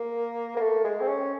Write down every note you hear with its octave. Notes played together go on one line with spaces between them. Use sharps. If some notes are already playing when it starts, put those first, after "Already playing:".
Already playing: A#3
A#3
A3
G#3
C4
C#4